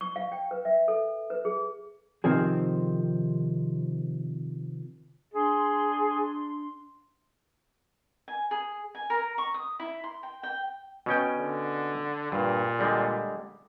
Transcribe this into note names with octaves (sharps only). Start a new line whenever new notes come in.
C#6
F5
G5
B4
E5
A4
B4
G#4
C3 D#3 F3 C4 G#4
D4 G#4 C6
G#5
G#4
G#5
A#4
C#6
D#6
E4
C6
G5
G5
B2 C#4 G5
D3
G2 A#2
D3 G3 G#3